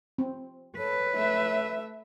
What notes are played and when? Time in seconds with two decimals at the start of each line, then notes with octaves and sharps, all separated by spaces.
0.18 C4
0.78 A4 B4 C#5
1.14 A3 E5